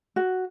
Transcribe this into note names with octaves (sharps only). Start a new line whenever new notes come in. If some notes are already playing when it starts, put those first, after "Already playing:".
F#4